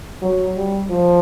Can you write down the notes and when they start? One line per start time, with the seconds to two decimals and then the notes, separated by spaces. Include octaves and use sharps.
0.22 F#3
0.56 G3
0.90 F3